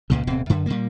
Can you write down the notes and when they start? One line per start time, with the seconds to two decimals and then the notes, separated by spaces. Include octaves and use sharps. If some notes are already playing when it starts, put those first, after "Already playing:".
0.10 C#2 A#2 C#3
0.27 D1 B2 C4
0.50 F#2 D3
0.66 A#2 G3 A#3